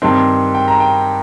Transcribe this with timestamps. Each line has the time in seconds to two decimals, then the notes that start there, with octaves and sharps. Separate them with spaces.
0.02 G2 D#3 C4
0.55 G5
0.68 A#5
0.80 G5